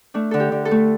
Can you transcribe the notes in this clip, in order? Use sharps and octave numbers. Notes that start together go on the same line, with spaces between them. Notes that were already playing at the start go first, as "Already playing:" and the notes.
A3 D4
D3 A4
G4
D3
A4
A3